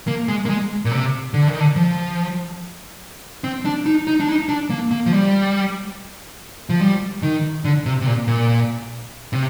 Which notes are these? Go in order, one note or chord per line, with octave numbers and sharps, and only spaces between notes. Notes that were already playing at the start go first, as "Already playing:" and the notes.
A#3
G#3
A#3
G#3
A#2
C3
D3
D#3
D3
F3
C4
D4
D#4
D#4
D4
D#4
D4
A#3
A#3
F3
G3
F3
G3
D#3
D3
C3
C3
A#2
A#2
C3